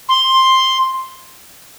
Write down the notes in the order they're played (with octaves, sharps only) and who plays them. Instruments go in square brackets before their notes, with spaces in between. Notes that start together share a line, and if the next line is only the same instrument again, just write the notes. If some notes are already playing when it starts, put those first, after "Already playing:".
[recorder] C6